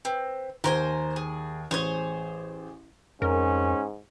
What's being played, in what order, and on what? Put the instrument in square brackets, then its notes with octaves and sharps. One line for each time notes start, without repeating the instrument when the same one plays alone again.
[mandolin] C4 [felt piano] B4
[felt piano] D#2 [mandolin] A#4 C5 G#5
[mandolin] G#4
[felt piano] A1 [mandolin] G#4 C5 C#5
[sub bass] F2 [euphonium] G#2 [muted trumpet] C#4 [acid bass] A#4